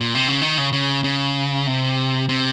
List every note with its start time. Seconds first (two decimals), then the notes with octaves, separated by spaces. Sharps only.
0.01 A#2
0.15 C3
0.28 C#3
0.41 D#3
0.58 C#3
0.73 C#3
1.04 C#3
1.67 C3
2.29 C3